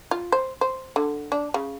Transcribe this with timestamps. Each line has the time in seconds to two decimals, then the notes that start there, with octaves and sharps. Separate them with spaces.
0.11 F4
0.32 C5
0.61 C5
0.96 D3
1.32 D4
1.54 C#3